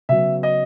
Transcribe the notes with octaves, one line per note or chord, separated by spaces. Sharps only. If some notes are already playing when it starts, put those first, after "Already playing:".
C#3 F#3 B3 E5
D#5